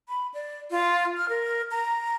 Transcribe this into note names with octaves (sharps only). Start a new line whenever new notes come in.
B5
D5
F4
F6
A#4
A#5